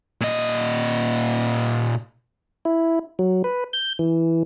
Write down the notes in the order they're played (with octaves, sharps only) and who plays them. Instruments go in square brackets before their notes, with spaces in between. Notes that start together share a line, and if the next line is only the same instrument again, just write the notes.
[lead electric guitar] A#2 D#5
[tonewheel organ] E4
F#3
B4
G6
E3